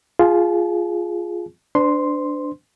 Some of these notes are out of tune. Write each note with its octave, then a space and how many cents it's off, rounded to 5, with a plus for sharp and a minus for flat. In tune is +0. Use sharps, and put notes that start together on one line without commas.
F4 +0 G#4 +0 A5 -40
D4 +0 C5 -45 C6 +0